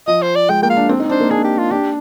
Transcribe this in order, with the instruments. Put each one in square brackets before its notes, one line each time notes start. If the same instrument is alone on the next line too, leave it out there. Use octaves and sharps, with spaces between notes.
[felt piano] F3 [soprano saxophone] D#5
[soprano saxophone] C5
D5
[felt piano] G#3 [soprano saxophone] G5
[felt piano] A#3 [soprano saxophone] G5
[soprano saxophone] F5
[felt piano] D4
C4
D#4
[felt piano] D4 [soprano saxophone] C5
[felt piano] A#3
[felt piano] D4 [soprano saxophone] G#4
[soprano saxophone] G4
F4
[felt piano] D4 [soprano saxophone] G4